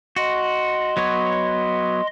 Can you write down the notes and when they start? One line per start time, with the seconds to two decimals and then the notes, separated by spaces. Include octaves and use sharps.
0.16 F#4 D#5 C6
0.97 F#3 B3 C#5